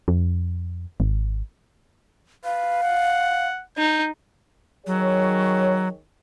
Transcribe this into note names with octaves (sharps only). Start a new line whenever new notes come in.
F2
G#1
B4 F5
F#5
D#4 G6
D#3 F#3 G#4 C#5